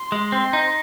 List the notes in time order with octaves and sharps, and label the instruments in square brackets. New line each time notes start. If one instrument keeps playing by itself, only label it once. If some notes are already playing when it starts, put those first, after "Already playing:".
Already playing: [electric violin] C6
[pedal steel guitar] G#3
C4
D#4